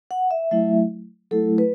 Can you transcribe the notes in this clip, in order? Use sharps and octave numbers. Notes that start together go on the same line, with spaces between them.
F#5
E5
F#3 A3 E4 E5
F#3 A3 E4 A4
B4